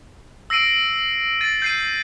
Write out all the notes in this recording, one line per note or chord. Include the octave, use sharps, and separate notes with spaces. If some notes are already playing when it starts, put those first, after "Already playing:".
E6 A#6 C7 D7 D#7
A6 C7 D#7
G6 C7 D#7